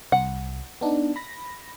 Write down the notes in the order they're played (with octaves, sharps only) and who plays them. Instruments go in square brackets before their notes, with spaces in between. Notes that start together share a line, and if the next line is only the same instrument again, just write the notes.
[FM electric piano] C2 [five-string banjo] F#5
[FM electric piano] B3 D4 D#4
B5 A#6